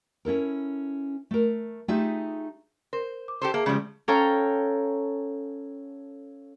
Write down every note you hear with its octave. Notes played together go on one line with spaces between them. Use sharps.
C#4 E4 A4 A#4
A3 A#4
A3 D#4 F4 G4 G#4 E5
A#4 C5
D6
G4 A4 C5
A#3 G#4 E5 A5
C#3 F3 G3 G#3
C#4 A4 C#5 F5 G5 A#5